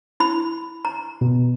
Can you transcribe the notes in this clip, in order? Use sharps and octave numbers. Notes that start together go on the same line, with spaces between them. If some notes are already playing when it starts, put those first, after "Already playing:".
E4 B5
A#5
B2